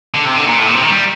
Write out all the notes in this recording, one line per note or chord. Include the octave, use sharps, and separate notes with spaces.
D3
C3
D3
A#2
A2
A#2
C3
D#3
G3